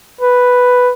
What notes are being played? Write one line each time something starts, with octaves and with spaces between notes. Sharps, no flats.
B4